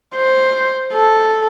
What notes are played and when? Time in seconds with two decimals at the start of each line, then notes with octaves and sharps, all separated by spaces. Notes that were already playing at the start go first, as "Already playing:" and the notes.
0.15 C5
0.93 A4